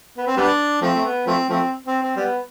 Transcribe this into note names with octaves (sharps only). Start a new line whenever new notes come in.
B3
C4
G3 B3 D4
F3 A3 C4
A3
B3
F3 A3 C4
F3 A3 C4
C4
C4
G3 B3